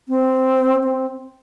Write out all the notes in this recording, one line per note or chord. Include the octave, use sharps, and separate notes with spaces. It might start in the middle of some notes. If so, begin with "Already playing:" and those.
C4
C4